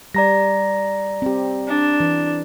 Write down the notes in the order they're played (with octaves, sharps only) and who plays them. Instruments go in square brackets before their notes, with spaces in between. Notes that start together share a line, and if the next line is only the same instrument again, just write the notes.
[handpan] G3 [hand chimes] D5 A#5 A#6
[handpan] C4 G4
[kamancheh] D4
[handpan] E3